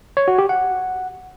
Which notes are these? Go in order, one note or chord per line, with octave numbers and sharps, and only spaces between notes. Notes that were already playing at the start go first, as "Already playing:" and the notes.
C#5
F#4
G4
F#5